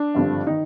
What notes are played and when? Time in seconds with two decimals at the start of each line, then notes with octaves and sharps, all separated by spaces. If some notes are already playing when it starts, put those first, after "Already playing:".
Already playing: D4
0.15 G#1 G2 D3 F3
0.47 D#3 D#4